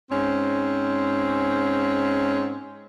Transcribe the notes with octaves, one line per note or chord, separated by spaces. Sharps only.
G#2 C4 C#4